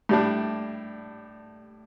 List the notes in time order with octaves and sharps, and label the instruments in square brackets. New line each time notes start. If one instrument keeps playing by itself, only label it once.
[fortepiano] A2 G3 D4